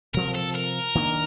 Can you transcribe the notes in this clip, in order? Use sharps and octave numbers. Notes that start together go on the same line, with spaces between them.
C3 F3 C4 A#4
A4
A#4
D#3 A#3 D4